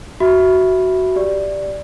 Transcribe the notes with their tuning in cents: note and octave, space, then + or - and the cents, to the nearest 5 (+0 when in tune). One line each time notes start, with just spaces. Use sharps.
F#4 +10 E5 +0 B5 +0
G4 +0 D5 +0